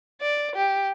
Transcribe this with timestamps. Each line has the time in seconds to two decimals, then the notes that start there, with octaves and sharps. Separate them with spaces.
0.21 D5
0.56 G4